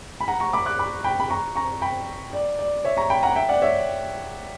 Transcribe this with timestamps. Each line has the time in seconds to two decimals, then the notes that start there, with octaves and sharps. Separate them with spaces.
0.20 B5
0.28 F#5 A#5
0.40 A#5 C#6
0.53 B5 D6
0.66 D6 F#6
0.79 B5 D6
1.04 G5 B5
1.20 B5
1.30 A#5 C#6
1.56 A#5 C#6
1.82 G5 B5
2.33 D5
2.59 D5
2.85 C#5 E5
2.97 A#5 C#6
3.10 G5 B5
3.23 F#5 A#5
3.35 E5 G5
3.49 D5 F#5
3.62 C#5 E5